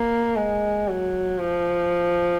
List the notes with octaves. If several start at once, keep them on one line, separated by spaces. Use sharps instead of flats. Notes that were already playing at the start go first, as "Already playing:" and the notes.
Already playing: A#3
G#3
F#3
F3